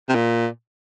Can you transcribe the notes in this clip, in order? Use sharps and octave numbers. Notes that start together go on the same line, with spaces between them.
C3
A#2